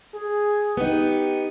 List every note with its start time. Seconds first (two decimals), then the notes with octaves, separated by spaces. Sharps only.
0.14 G#4
0.77 B3 D#4 G4